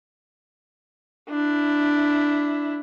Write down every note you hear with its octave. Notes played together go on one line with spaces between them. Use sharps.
D4 E4